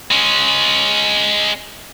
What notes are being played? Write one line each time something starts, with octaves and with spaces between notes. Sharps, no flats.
G#3 C#4